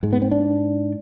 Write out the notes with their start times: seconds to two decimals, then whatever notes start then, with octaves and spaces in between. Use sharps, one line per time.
0.03 G#2 G#3
0.13 B3
0.22 C4
0.31 D4